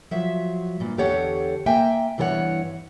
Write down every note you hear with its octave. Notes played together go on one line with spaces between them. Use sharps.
F3 F#3 E5
G2 A#2
E2 D3 G4 A4 C#5 F#5
A#3 E5 G5 G#5
G2 E3 B3 A#4 C#5 F#5